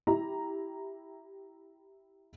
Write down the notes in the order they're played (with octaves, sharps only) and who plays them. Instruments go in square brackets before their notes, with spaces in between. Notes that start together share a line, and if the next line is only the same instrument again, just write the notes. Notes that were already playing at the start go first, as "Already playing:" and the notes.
[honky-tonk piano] E4 G4 A#5